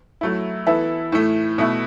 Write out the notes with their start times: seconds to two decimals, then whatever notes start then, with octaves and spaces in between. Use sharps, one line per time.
0.21 F#3 A3 E4
0.67 E3 B3 E4 A4 E5
1.12 A2 E3 A3
1.58 B2 A3 E4